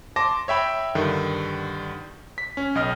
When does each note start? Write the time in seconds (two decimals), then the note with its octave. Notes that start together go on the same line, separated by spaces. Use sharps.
0.16 A5 C6 D6 A#6
0.48 C#5 E5 G5 B5
0.95 G2 D3 D#3
2.38 B6
2.57 C#4
2.75 B1 D#5 F6